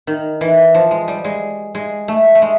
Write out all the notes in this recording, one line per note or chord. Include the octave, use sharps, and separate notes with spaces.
D#3
E3
F3
G#3
G3
G#3
G#3
A3
A3
G#3